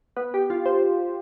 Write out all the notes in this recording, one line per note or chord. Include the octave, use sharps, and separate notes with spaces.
B3
G4
F4
C5